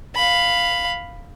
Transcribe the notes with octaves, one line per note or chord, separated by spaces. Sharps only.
F5 B5